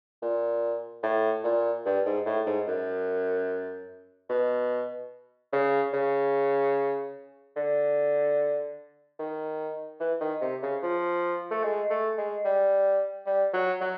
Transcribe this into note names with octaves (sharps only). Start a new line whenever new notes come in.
A#2
A2
A#2
G2
G#2
A2
G#2
F#2
B2
C#3
C#3
D3
D#3
E3
D#3
C3
C#3
F3
A3
G#3
A3
G#3
G3
G3
F#3
F#3